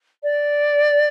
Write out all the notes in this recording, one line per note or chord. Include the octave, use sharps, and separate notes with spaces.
D5